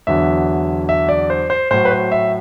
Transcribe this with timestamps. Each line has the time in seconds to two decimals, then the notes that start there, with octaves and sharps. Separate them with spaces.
0.07 E2 D3 F#3 E5
0.89 E5
1.09 D5
1.30 C5
1.50 C5
1.71 A2 F#3 C5
1.85 B4
1.90 C5
2.12 E5